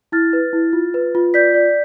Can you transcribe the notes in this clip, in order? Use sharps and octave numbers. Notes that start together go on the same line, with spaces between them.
E4 F6 A6
B4
E4
F4
B4
F4
D5 G6 B6
D5